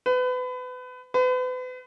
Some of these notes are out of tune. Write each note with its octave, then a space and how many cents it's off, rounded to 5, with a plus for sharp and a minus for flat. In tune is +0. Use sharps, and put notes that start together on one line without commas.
B4 +30
B4 +40